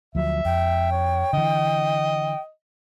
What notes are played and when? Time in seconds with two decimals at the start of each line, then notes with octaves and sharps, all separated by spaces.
0.15 D2 F3 F#3 E5
0.45 F2 G5
0.91 C#5
1.33 D3 E3 D#5